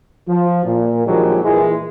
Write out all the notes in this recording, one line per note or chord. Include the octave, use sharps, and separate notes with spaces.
F3
A#2
A#1 D#3 F3 F#3 G#3 G4
A#2 E3 G#3